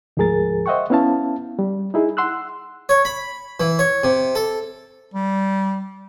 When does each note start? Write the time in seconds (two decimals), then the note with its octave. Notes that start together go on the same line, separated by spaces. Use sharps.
0.17 D2 G#2 F3 G#4 A#4 A6
0.66 C5 D#5 E5 F#5 G5 C#6
0.90 B3 C#4 E4 F5 A5
1.59 G3
1.94 D#4 E4 G#4
2.17 F#5 C6 E6 F#6
2.89 C#5
3.05 B5
3.60 E3
3.79 C#5
4.04 C3
4.35 A4
5.14 G3